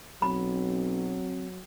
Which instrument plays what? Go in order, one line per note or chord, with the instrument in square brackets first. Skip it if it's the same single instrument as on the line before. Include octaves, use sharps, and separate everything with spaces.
[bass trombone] B1 [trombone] F#3 [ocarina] C4 [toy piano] B5